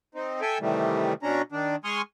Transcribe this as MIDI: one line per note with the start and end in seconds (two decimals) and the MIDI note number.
0.15 0.41 60
0.15 0.41 63
0.41 0.58 69
0.41 0.58 76
0.41 0.58 79
0.41 0.58 80
0.61 1.13 48
0.61 1.13 51
0.61 1.13 52
0.61 1.13 55
0.61 1.13 57
1.23 1.42 47
1.23 1.42 61
1.23 1.42 62
1.23 1.42 82
1.52 1.76 51
1.52 1.76 62
1.84 2.02 56
1.84 2.02 80
1.84 2.02 84
1.84 2.02 85
1.84 2.02 87
1.84 2.02 89